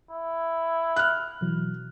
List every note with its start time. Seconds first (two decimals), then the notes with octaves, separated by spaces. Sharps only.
0.11 E4
0.96 F6 F#6
1.41 B2 E3 F#3